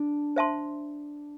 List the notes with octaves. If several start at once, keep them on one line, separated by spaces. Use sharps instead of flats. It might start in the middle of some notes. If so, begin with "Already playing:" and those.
Already playing: D4
C5 E5 A5 C6